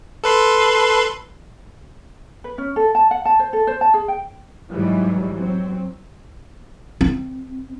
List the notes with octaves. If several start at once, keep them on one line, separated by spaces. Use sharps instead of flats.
A4 B4 C6
B4
C#4
A4
A5
F#5
A5
C5
A4
C5
A5
G#4
G5
G#2 E3 F#3 G3
F#3 C4
C4